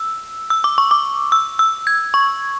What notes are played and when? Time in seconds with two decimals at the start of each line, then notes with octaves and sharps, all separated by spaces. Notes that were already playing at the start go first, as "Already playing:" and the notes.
Already playing: E6
0.50 E6
0.64 D6
0.78 C#6
0.91 D6
1.32 E6
1.59 E6
1.87 G#6
2.14 C#6